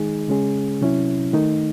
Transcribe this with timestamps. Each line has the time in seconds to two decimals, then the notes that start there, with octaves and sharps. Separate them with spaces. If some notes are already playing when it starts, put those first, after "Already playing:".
Already playing: D#3 G#3 D#4 G#4
0.28 C#3 G#3 C#4 G#4
0.81 C3 F#3 C#4 E4
1.33 D#3 A3 D#4